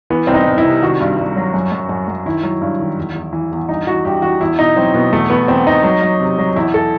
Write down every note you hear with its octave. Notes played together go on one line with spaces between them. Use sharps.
E3 B3
C2 C4
D#4
C2
E4
C3
D#3 F#4
G2
G2
F#3
F#2
F#2
F#2
F#2
D#3 E4
F#3
G2
D#3
E2
E2
E3
E2
G2 D#4
E3 F#4
G2 G4
E3 F#4
E2 E4
B2 D#4
F#3 C4
B2 B3
E2 A3
E2 B3
E2 C4
E2 D#4
F#3
F#3
C3
F#3
E2 E4
A4